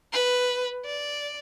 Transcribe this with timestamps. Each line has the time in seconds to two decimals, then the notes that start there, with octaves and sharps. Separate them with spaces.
0.12 B4
0.85 D5